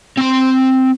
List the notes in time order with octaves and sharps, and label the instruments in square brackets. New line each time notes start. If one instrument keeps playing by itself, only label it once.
[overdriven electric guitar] C4 C6